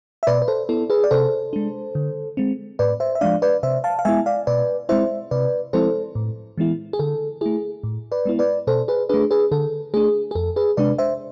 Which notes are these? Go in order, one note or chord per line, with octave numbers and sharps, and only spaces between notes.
E5
B2 B4 D5
B4
A4 C5
B3 E4 A4
G#4 B4
D5
C3 A4 C5
G#3 D4
D3
G#3 C4
A2 B4 D5
C5 E5
E5
F3 G#3 D4 D5 F5
B4 D5
C3 C5 E5
F5 A5
F5
G#3 B3 E4 E5 G#5
D5 F5
B2 B4 D5
G#3 C4 E4 C5 E5
C3 B4 D5
F3 G#3 C4 E4 A4 C5
A2
E3 G#3 B3 E4
G#4
D3 A4
A3 E4 G#4
A2
B4 D5
G#3 B3 E4
B4 D5
B2 A4 C5
G#4 B4
A3 D4 G#4 B4
G#4 B4
D3 A4
A3 D4 G#4
G#4
F2 A4
G#4 B4
C3 G#3 D4 B4 D5
C5 E5